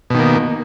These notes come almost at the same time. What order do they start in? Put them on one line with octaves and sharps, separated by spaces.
B2 D#3 A#3